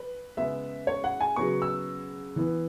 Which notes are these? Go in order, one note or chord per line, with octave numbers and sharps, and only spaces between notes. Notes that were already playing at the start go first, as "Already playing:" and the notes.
Already playing: B4
C#3 G#3 B3 E5
C#5
F#5
G#5
C#3 F#3 B3 C#6
E6
E3 B3